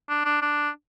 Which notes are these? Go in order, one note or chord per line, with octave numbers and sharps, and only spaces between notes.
D4
D4
D4